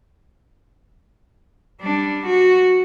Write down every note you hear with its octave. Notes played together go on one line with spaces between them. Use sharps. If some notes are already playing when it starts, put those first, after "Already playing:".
G3 D4
F#4